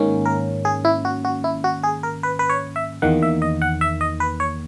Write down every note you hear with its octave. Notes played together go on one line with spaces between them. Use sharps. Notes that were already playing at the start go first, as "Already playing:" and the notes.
Already playing: G#2 D#3 A#3 C#4
A#4
G#4
E4
F#4
F#4
E4
F#4
G#4
A#4
B4
B4
C#5
E5
E2 D#3 A#3 F#5
E5
D#5
F#5
E5
D#5
B4
C#5